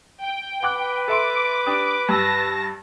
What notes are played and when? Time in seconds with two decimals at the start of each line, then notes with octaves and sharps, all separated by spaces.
0.22 G5
0.63 B4 F#5 D6 F#6
1.08 A4 E5 C6 D6
1.66 D4 G4 D#6
2.09 G2 A5 E6 A#6